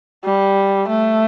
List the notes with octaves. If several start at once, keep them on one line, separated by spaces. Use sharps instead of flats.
G3
A3